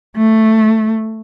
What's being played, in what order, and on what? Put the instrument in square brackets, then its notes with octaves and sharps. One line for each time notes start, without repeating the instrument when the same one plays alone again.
[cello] A3